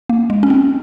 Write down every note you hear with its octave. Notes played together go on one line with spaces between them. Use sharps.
A#3
G#3
C#4
C4